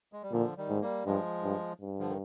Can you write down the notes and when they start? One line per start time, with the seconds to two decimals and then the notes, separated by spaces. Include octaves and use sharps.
0.13 G#3
0.23 G3
0.32 A#2 D3 F3
0.57 D#3 G3
0.69 G#2
0.81 G3 A#3
1.06 G2 F3 G#3
1.43 G2
1.81 G2
1.99 D3 F3
2.09 D#3